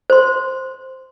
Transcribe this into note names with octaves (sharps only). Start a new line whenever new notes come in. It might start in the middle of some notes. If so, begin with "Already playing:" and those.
C5 C6